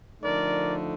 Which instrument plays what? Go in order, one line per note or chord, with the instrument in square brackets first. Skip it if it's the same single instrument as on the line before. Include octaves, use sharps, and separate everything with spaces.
[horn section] D3 F3 A3 D#4 A#4 D5